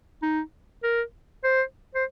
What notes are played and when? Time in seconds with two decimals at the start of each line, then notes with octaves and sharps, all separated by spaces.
0.23 D#4
0.83 A#4
1.44 C5
1.95 C5